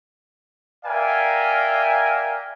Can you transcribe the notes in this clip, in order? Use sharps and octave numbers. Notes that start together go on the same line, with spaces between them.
A#4 D5 E5 F5 G5 G#5